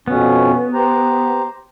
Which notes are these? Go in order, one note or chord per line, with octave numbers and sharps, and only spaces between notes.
F2 B2 B3 C#4
G4 C5 A#5